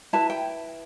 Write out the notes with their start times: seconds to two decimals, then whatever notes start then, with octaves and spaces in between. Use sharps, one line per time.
0.13 E4 B4 A5
0.30 G5